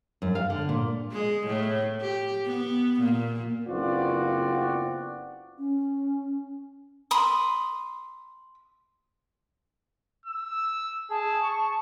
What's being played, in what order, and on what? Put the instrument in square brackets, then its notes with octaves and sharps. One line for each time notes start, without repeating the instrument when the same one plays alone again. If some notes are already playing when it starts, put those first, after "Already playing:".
[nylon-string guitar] F#2
F5
D3
A#2
[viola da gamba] G#3
A2
G4
B3
A#2
[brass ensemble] F#1 B3 C4 F4 F#4 D5
[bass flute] C#4
[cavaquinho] B5 C6 D#6
[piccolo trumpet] E6
[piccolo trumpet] G#4 [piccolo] A5
[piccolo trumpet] C#6